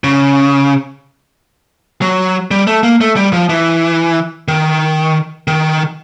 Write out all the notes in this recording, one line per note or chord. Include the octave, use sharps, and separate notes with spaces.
C#3
F#3
G3
A3
A#3
A3
G3
F3
E3
D#3
D#3